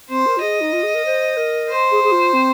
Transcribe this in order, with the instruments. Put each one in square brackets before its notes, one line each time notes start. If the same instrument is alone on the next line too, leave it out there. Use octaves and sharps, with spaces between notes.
[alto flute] C4 [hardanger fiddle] C5
[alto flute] A#4
F4
[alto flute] G#4 [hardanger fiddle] D#5
[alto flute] D#4
F4
G#4
A#4
C5
A#4
[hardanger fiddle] C5
[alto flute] G#4
G#4
F4
C4